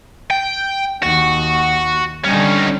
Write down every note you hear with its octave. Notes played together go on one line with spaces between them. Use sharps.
G5
D#2 F#4
D3 G3 C#4 D#4